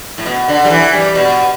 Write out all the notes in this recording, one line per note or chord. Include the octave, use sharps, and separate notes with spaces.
A2
B2
D3
G3
E3
G3
B2